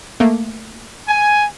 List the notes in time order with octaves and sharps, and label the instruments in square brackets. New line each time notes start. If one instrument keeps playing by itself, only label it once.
[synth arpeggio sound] A3 A#3
[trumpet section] G#5